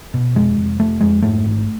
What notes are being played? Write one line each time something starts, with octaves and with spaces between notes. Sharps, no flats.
B2
F1 G#3
F1
F1 A3
F2 G#3
G#2 A3
G#1